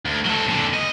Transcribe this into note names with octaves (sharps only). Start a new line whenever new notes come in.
D2
F#3 A4
A#2 D3
D#5